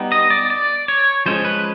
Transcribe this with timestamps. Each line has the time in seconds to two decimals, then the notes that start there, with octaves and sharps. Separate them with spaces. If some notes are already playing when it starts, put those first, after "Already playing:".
Already playing: G3 B3 D#4
0.12 D#5
0.30 D5
0.50 D5
0.88 C#5
1.26 F3 G#3 C#4 C5
1.45 B4